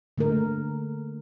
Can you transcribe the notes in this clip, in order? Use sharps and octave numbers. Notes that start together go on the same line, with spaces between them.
D3 A3 A#3 A#4